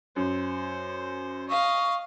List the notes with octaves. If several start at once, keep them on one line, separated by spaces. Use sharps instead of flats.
F#2 C5
D#5 F5 C#6